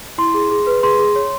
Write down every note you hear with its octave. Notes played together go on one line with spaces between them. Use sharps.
E4 C6
G#4
G#4
B4
G#4 C6
G#4
C#5